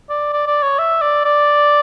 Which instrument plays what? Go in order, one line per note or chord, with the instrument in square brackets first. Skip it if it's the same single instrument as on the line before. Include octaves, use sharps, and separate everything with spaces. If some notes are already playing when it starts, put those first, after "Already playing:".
[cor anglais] D5
D5
D5
C#5
E5
D5
D5